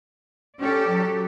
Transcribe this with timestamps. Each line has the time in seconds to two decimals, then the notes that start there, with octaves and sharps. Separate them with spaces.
0.59 C#4 G4 A4 D5
0.88 F#3